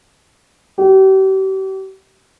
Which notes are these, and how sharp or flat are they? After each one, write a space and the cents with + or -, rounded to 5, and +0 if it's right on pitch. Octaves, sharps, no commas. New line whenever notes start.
G4 -40